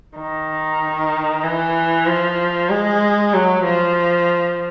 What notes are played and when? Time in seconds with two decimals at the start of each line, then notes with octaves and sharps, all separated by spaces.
0.16 D#3
1.44 E3
2.06 F3
2.70 G#3
3.33 F#3
3.65 F3